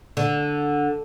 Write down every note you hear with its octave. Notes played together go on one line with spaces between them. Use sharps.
D3